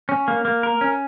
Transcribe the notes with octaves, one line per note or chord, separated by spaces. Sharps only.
C#4
A#3
A#3
A#4
C#4